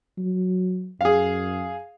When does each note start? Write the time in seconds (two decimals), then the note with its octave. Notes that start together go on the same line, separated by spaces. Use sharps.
0.18 F#3
1.01 F#2 G#4 F5